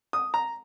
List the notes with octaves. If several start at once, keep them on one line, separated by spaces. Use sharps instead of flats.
D#6
A#5